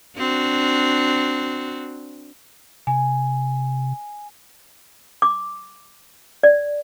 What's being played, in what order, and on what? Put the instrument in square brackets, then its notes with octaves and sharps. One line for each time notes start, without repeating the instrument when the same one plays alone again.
[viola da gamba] C4 D4 F#4
[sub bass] C3 [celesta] G#5
[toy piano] D6
D5